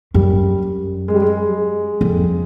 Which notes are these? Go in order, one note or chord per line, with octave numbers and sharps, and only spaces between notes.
F#2 G3
G#3
G3
G#3
F2